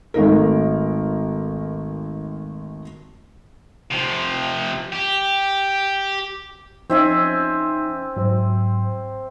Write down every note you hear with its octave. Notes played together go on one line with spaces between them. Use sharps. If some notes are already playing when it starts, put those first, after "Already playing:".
G#1 A3 D#4 A#4
C3 F3
G4
F3 C4 C#4 D#4 E5 G#5
G#2 F#3 C5